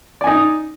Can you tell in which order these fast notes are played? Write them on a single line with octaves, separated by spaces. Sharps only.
D5 G#5 D#4